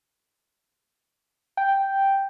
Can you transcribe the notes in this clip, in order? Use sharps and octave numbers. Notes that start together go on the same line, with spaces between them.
G5